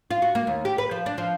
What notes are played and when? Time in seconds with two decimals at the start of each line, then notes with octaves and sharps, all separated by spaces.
0.11 F4
0.22 F#4
0.35 A#3
0.47 D#2
0.65 G4
0.78 B4
0.91 F3
1.06 D4
1.18 F3